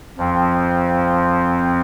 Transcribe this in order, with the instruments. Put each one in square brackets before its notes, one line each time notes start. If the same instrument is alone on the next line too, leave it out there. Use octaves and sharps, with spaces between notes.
[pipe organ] F2 F3 C4